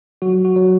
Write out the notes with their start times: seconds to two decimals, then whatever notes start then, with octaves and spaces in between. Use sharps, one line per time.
0.22 F#3 F#4
0.45 F#4
0.56 F#3